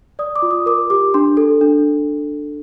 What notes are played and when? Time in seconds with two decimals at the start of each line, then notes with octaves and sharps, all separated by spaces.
0.19 D5 D#6
0.36 D6
0.42 F4
0.51 D#6
0.66 A#4 D6
0.90 G4 D6
1.14 D4 C6
1.37 A4
1.61 D4